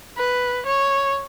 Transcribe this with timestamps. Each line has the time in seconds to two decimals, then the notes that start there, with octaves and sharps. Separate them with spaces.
0.17 B4
0.66 C#5